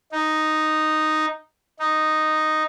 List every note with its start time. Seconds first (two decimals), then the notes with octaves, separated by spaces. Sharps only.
0.12 D#4
1.80 D#4